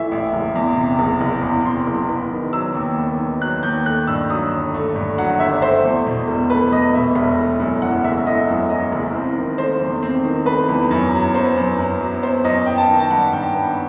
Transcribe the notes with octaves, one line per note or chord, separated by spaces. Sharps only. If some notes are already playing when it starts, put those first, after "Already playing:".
Already playing: A1 A2 E3 A3 E5
A1
F#1
E2
C3
F#1
F#1
E2
C3 C6
F#1
B3
D#3
F#3 E6
D#2
B3
D#3
F#3 F#6
D#2 G6
A3 F#6
G2 E6
F#3 D#6
G1
A3
G2
F#3 F#5
G1 E5
A3 C5
E2
B2
E1
A3 B4
E2 D#5
B2 E5
E1
A3
F#2
E3 F#5
F#1 E5
A3 D#5
F#2
E3 D#5
F#1
C4
D#3
A3 C5
E2
C4
D#3
A3 B4
E2
F#2
F#3
B3 C5
F#2
F#2
F#3
B3 C5
F#2 D#5
B3 G5
A5
D#3
A5
G3 F#5
G2 G5
B3